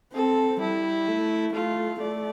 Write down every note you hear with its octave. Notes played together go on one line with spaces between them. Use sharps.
C4 A4
G3 E4
A3
A3 F4
A3 D5